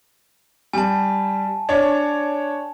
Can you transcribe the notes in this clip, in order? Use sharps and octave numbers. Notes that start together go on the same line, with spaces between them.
G3 G#5 A5
D4 C#5